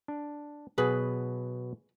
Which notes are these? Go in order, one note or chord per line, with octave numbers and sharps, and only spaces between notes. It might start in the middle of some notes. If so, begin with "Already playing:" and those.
D4
B2 F#3 G#4 B4